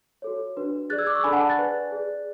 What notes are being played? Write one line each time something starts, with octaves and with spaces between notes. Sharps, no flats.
F#4 A4 C#5
D4 F#4 B4
G#4 D5 F#6 A6
E6 G#6
D6 F#6
C#6 E6
D4 A4 D5 G#5 B5
F#5 A5
F#6 A6
G#4 B4 D5
G#4 D5